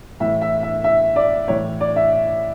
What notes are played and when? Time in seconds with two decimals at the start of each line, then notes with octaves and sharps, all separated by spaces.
0.20 A2 E3 E5
0.41 E5
0.63 E5
0.84 E5
1.16 D5
1.48 A2 E3 C#5
1.80 D5
1.96 E5